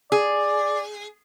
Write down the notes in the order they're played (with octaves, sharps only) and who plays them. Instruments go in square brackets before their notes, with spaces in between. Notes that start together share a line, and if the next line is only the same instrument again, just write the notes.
[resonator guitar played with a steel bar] G#4 [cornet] D5